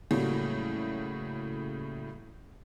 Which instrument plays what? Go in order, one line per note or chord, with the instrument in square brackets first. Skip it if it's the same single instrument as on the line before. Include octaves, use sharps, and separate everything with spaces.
[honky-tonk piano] A2 C#3 F#3 G3 A3 A#3